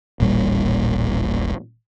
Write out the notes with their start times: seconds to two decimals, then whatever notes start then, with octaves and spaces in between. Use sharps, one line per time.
0.20 D#1 A1 A#2 G3